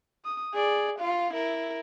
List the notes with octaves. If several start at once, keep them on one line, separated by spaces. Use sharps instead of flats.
D#6
G#4 D5
F4 F5
E4 A#4